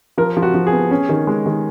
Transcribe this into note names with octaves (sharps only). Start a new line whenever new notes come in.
F3 A#4
F3
F#4
F3
G#4
B3
C#4
D#3
G#3
D#3